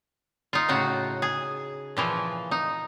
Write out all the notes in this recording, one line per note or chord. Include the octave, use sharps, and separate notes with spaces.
D#4 F4
A2 C#3 F#4
G#4
A#2 E3 F3
D#4